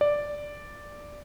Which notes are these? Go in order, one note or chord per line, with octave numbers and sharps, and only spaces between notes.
D5